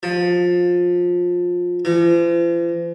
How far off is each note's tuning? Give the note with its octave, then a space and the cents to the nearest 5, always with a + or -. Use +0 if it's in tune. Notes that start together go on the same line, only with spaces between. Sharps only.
F3 +20
F3 -45